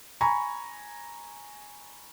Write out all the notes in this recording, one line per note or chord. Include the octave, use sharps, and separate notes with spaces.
G#5 A#5 B5 C#6